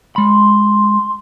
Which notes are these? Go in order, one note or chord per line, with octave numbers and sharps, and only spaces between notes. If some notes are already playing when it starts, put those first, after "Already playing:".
G#3 B5 C6